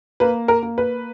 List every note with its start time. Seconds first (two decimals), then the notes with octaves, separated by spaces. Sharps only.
0.20 A#3 B4
0.48 A#4
0.63 A#3
0.78 B4